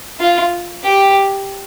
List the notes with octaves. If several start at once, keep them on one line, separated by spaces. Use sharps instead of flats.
F4
G4